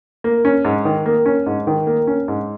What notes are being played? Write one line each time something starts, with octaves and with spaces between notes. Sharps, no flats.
A#3
C#4
G#2
D#3
A#3
C#4
G#2
D#3
A#3
C#4
G#2